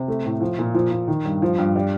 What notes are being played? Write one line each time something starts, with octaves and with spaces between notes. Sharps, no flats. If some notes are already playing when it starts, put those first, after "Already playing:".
Already playing: C3
A3
A2
F3
A#2
F3
A#2
D#3
G2
F3
G2
G3